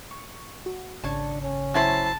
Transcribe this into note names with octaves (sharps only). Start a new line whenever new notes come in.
C#6
F#4
G#1 C#3 D4 C#5 A5
C#4
F#3 E4 C5 A5